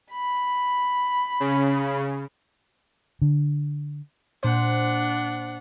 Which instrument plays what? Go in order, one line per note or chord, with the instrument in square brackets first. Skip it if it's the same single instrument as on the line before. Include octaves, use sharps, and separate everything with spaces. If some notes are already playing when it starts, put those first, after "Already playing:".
[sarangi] B5
[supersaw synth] C#3
[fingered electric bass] D3
[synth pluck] A#2 C5 [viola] D4 F#5